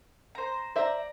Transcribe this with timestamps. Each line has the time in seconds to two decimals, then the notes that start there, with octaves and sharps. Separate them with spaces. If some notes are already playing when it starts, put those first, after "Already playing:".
0.35 C5 A#5
0.76 C5 D5 E5 A#5